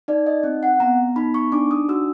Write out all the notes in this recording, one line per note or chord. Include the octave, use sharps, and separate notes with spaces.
D#4 D5
D#5
C4
F#5
B3 A#5
D#4 B5
C#6
D4 D6
D#6
F#4 E6